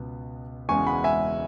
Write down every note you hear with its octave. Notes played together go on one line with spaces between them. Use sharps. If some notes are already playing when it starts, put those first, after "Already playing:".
Already playing: C#2 B2 B3
E1 E2 C#3 E3 G#3 G#5 C#6
F#5 B5
E5 G#5